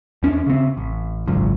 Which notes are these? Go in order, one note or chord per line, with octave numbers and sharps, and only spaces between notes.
E2 C#4 D4
C#3 C4
A1
G#1 C#2 F#2